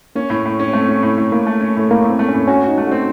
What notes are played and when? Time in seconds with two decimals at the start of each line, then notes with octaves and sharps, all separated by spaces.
0.16 A#3 C#4
0.30 A2
0.45 A2
0.59 C#4
0.73 A3 C4
0.88 C#4
1.03 A2
1.18 A2
1.32 A2 A#3
1.47 A3
1.60 C#4
1.76 A2 A3
1.91 A2 A#3
2.05 A2
2.10 C4
2.19 A3
2.29 C#4
2.34 A2
2.48 C#4 F#4
2.63 D#4 F#4
2.78 A3
2.87 C4 F#4